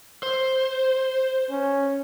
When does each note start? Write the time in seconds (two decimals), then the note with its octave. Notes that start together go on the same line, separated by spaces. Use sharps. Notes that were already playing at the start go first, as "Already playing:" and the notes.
0.23 C5
1.51 C#4